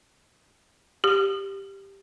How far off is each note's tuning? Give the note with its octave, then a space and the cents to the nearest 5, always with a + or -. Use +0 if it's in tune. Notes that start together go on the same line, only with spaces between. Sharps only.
G4 +0 D#6 -40